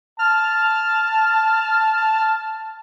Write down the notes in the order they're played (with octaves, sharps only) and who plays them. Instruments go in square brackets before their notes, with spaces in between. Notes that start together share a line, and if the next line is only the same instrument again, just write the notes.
[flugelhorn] A5 [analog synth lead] F6